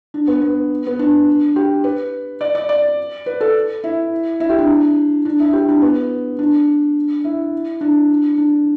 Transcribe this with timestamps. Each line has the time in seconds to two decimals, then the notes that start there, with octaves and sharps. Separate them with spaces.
0.14 D4
0.27 B3
0.41 B3
0.87 B3
0.99 D4
1.56 G4
1.84 B4
2.41 D5
2.55 D5
2.69 D5
3.26 B4
3.41 A4
3.84 E4
4.40 E4
4.49 G4
4.58 D4
5.25 D4
5.40 E4
5.53 G4
5.68 D4
5.82 B3
6.39 D4
7.24 E4
7.81 D4
8.38 D4